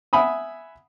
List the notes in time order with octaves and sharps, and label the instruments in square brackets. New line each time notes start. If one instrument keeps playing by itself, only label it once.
[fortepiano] E5 F#5 G#5 B5 D#6